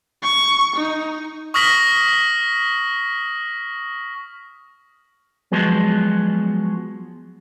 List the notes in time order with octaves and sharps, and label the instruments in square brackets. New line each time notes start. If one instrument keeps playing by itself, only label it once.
[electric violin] C#6
D#4
[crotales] C#6 D#6 F6 A#6 B6 F#7
[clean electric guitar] F3 F#3 G#3 B3